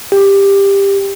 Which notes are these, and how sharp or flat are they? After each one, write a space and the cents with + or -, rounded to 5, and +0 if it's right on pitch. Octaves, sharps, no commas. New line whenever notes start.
G4 +15